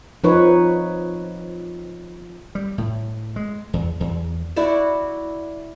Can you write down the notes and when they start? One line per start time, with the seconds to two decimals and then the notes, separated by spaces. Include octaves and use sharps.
0.24 F3 D#4 B4 C#5
2.55 G3
2.78 A2
3.36 G#3
3.73 E2
4.00 E2
4.56 E4 F#4 D5 E5